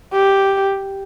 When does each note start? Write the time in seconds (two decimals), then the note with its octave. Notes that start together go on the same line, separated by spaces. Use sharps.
0.13 G4